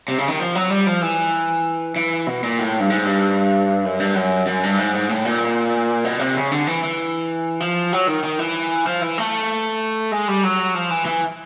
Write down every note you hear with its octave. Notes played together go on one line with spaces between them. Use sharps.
C3
C#3
D#3
F3
F#3
G3
F3
E3
E3
B2
A#2
A2
G2
G#2
G2
F#2
G2
F#2
F#2
G2
G#2
G#2
A2
A#2
B2
C3
C#3
D3
E3
E3
F3
F#3
D#3
D#3
E3
F3
E3
A3
G#3
G3
F#3
F3
E3
E3